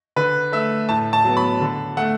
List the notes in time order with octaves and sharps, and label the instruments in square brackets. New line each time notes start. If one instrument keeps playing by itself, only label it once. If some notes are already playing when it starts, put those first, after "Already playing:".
[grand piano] D3 B4
A3 E5
A2 A5
A5
F#3 B3
B5
D3
A3 F#5